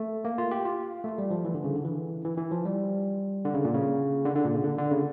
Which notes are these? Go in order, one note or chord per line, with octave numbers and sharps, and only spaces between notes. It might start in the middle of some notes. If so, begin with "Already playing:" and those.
Already playing: A3
A#3
F4
G4
F4
A3
G3
F3
E3
D3
C#3
D3
E3
E3
E3
F3
G3
D3
C#3
A#2
C#3
D3
D3
A#2
C#3
D3
D3
C#3